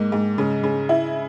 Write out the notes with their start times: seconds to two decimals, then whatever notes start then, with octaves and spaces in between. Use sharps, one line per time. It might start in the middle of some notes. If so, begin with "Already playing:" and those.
Already playing: G#2 A#3
0.12 G#2
0.38 C#3
0.63 C#3
0.89 E4